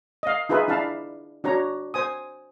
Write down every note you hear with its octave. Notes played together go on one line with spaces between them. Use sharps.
D#5 F5
D#4 F4 G#4 B4 E5
D4 E4 F5 A5 B5
D4 F#4 C#5 A#5
C5 G#5 D#6